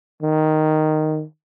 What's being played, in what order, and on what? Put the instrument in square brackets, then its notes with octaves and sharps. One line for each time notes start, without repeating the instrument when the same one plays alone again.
[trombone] D#3